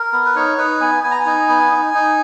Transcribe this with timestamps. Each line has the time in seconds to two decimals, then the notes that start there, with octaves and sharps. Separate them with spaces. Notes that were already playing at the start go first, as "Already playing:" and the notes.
Already playing: A#4
0.13 B3
0.25 B4
0.35 D#4 C#5
0.58 D#4 B4
0.81 B3 G#5
1.03 B3 G#5
1.11 A#5
1.20 G#5
1.26 D#4
1.49 B3
1.71 D#4
1.94 D#4